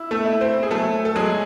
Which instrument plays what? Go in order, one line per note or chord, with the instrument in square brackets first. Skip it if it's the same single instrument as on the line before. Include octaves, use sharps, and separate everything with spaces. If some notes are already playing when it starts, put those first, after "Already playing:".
Already playing: [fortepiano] E4
[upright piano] A3 A4
[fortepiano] E4
[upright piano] C4 C5
G#4
[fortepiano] F#3 [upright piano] A3 A4
[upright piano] A4
[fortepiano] F#3 [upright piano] G#3 G#4